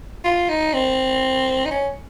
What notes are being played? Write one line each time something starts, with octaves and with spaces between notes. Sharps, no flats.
F4
D#4
C4
D#4
C#4